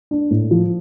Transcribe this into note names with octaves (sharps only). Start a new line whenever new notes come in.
D4
A2
F3